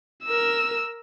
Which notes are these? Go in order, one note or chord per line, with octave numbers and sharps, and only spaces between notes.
A#4 E6